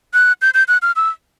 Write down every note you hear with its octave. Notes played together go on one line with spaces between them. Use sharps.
F#6
G6
G6
F#6
F6
E6